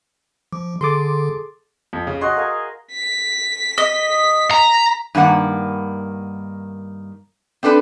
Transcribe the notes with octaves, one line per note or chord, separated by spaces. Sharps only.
F3 D6
D3 G#4 A4 C6 D6 A6
F2
C#3
F#4 G#4 D#5 C6
A#4 F5 G#5
B6
D#5
A#5
G2 D#3 A#3 F#5
C4 D4 A4 B4